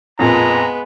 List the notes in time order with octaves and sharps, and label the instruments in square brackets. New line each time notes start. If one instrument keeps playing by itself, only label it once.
[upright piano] F2 A#2 [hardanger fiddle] G#3 B3 [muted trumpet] A#5